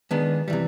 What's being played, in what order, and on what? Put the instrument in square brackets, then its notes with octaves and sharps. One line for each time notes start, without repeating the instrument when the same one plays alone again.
[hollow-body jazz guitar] D#3 G#3 B3 D4
C3 E3 G3